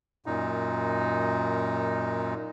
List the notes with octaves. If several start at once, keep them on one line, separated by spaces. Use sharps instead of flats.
F#2 A#2 D#4